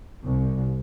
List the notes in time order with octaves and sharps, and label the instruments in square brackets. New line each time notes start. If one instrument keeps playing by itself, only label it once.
[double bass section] C2